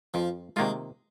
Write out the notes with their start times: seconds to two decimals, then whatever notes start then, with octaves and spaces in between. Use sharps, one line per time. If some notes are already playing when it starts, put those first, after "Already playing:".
0.14 F2 F3
0.56 C3 D#3 G#3 A#3 F4